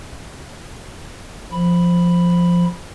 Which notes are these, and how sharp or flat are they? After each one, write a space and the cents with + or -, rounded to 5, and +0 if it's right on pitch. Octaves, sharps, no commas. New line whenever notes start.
F3 +0 B5 +0